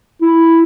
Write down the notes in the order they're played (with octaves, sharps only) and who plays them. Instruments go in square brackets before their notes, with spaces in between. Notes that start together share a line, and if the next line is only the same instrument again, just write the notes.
[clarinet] E4